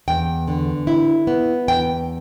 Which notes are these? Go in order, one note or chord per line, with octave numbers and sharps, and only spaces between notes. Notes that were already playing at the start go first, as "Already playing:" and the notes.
E2 G5
D3
E4
B3
E2 G5